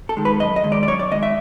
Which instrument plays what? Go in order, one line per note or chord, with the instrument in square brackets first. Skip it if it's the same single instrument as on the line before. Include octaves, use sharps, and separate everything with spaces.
[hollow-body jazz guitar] A4
D#3 G#3
B4
F#2 D#5
D#5
D#3 G#3
D5
D5
F#2 C#5
D5
D#3 G#3 D#5
E5